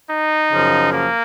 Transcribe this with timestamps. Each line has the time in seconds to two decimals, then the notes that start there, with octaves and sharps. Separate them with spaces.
0.09 D#4
0.51 F#2 C#3 F3
0.92 A#3